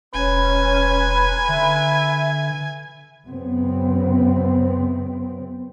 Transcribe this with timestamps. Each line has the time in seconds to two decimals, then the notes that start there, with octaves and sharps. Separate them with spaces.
0.14 E1 C#4 B4 G#5
1.48 D3 E5
3.28 F#2 C#3 B3 C4